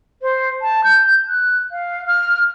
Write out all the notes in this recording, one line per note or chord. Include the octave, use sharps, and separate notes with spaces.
C5
A5
G6
F#6
F5
F6